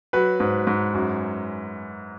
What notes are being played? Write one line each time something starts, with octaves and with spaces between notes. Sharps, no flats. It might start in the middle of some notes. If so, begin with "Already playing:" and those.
F#3 B4
G#2
G#2
F#2